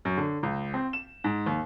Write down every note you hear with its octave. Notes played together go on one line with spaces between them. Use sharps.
F#2
D3
C#2
C4
E7
G#2
D#2